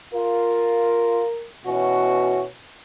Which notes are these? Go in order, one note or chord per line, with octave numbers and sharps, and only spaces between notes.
F4 A#4
B2 E3 C#4 F#4